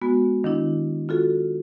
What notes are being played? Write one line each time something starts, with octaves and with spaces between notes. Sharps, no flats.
G#3 B3 F#4
D#3 D4 E4
F4 F#4 A4